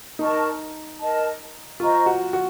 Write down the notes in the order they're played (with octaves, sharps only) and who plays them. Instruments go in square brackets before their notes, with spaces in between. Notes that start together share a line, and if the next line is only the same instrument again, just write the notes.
[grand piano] D#4 [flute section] A#4 D#5 A5 C#6
[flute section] A#4 D#5 A5
[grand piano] F4 [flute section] C5 D#5 A#5 C#6
[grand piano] F#4
F#4